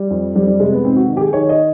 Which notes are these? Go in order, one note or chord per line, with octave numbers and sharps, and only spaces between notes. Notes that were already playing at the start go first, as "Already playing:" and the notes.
Already playing: G3
F2
F2 G3
G3
C3 G#3
B3
G#2 C4
F#4
D#3
G4
G#4
D#3 C#5
D#5